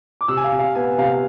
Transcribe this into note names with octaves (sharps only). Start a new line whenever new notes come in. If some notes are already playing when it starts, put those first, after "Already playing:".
D6
C3 E6
G#5
F5
C3
F5
B3 G#5
C3 F5